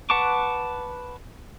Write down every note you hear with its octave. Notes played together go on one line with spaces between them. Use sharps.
B4 F#5 A5 C#6 D6